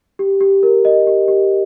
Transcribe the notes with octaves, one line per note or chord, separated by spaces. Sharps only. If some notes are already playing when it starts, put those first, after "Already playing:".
G4
G4
A#4
D#5
G4
G4